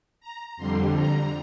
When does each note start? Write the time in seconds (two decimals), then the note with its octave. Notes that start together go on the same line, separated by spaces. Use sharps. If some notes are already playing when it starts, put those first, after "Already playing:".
0.21 A#5
0.57 F2 D3 G3 C6
0.94 A#5